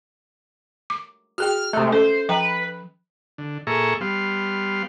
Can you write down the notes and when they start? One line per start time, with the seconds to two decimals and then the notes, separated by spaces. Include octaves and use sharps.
0.90 D6
1.38 F#4 G#4 G5 F6
1.73 C3 G#3 A3 E5
1.92 C#4 A4 C5
2.29 F3 B4 G5 A#5
3.38 D3
3.67 A#2 G#4 A4 E5 A#5 C#6
4.01 G3 B3 F5 C6